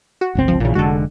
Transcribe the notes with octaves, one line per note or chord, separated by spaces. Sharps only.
F#4
G1 C#2 C4
F3
A#1 A#2 C#3 E3
F1 D3 G#3 F#4 A4